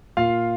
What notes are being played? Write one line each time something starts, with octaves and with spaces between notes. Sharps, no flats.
A#2 F4 F5